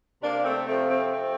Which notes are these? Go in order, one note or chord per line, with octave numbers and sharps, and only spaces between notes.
C3 A#3 D4
A3 C4
F3 A3 C4
A3 C4
F3 A3 C4